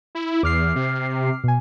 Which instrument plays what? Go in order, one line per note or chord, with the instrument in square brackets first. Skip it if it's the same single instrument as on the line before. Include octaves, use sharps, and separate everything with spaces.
[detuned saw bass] E4
[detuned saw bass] E2 [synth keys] D6 F6 C7
[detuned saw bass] C3
[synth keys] B2 G#5